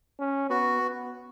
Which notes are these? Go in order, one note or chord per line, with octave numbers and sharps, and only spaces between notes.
C#4
B3 F#4
B3